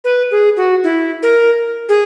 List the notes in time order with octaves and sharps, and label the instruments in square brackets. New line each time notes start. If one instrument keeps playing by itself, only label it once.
[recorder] B4
G#4
F#4
E4
A#4
G#4